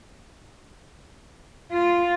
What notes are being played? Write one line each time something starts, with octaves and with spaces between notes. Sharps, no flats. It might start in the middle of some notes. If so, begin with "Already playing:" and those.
F4